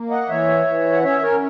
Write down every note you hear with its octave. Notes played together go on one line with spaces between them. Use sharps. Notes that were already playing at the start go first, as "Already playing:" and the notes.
Already playing: A#3
D#5 F#5
E3 C#5 E5
E3
F#5
C#4 C#5 E5
A#4 C#5